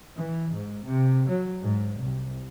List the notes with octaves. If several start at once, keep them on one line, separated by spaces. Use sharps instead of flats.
E3
G#2
C3
F#3
G#2
C2